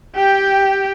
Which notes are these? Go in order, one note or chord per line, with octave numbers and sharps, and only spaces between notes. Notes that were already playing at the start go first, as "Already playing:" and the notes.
G4 G5